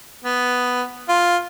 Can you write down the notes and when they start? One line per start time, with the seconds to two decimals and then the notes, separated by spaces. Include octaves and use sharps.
0.25 B3
1.09 F4